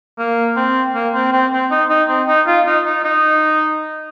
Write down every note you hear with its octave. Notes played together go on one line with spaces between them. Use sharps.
A#3
C4
A#3
C4
C4
C4
D#4
D#4
C4
D#4
F4
D#4
D#4
D#4